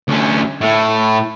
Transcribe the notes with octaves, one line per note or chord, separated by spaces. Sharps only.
D2 C#4
A2